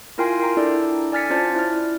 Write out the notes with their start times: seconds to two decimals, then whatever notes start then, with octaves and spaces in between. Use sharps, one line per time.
0.18 E4 F4 A#4 G5 G#5 C6
0.40 A#4 G5 A#5
0.57 D4 E4 A4 D5
1.12 D5 G#5 F6 A6 B6 C#7
1.30 C#4 F4 C5 D5 A5 A6
1.55 E4 F6